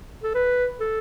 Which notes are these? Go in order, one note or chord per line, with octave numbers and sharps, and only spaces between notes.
A4
B4
A4